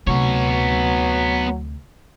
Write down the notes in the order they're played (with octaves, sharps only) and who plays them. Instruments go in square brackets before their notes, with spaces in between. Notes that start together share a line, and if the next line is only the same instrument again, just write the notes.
[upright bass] D2 C3 [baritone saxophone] F#3 [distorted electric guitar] B3 C#5